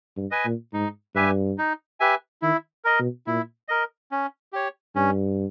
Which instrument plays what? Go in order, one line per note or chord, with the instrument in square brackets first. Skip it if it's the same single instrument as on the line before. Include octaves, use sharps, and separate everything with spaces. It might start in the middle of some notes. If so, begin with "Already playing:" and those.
[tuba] G2
[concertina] B4 D#5 G#5
[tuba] A#2
[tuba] G#2 [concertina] D#4
[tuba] G2 [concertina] G4 B4 E5 G#5
[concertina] D#4
G4 B4 E5 G#5
[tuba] D#3 [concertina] E4
[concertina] A#4 D#5
[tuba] B2
[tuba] A#2 [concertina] E4
[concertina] A#4 D#5
C#4
G4 C#5
[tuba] G2 [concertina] C#4